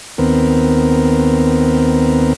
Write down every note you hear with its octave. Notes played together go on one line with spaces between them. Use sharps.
D#2 B3 C4 A#4